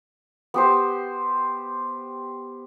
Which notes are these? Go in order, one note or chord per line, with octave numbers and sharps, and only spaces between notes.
B3 G4 C5